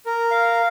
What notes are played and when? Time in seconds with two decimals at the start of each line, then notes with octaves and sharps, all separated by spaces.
0.06 A#4
0.31 F5